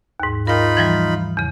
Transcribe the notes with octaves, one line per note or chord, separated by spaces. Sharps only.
D#2 G#2
D#4 F4 A#4 G5 B5
E3 F3 G3
E2 C#3